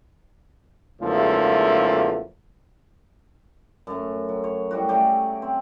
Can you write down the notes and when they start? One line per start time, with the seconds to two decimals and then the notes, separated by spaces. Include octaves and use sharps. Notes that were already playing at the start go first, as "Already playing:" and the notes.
1.02 E2 G#2 C#3 F3 A3 A#3
3.87 F#2 A3
4.29 F#3
4.44 C#5
4.71 A2 G3 F#4
4.89 F#3 A3 G4 G#4
5.42 C4